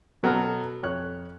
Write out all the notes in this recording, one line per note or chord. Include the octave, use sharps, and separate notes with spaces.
B2 F#3 B3 A4 A#5 F6
F2 C#5 F#6